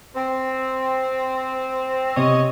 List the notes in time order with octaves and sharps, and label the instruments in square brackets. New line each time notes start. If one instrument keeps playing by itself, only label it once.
[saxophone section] C4
[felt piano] C3 [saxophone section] C#5 D#5